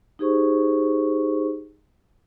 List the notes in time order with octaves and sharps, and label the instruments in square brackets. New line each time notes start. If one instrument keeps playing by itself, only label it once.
[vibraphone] D#4 G4 G#4 C5 C#6